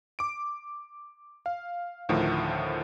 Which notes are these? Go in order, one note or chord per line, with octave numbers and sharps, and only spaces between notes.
D6 D7
F5
D2 A2 D#3 F3